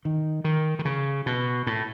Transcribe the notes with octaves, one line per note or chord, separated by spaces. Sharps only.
D#3
D#3
D#3
C#3
B2
A2